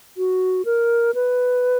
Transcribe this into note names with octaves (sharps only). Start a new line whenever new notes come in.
F#4
A#4
B4